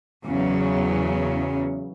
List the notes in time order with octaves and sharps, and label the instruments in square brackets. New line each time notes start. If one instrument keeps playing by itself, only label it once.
[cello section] E2 C#3 F#3